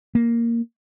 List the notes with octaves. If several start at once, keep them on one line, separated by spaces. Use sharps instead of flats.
A#3